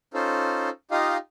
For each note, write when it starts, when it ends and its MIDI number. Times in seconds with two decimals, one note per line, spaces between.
0.14 0.69 61
0.14 0.69 63
0.14 0.69 65
0.14 0.69 69
0.14 0.69 72
0.91 1.17 63
0.91 1.17 65
0.91 1.17 67
0.91 1.17 75
0.91 1.17 77